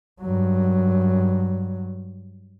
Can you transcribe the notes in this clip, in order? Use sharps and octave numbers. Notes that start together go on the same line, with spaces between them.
G2 F#3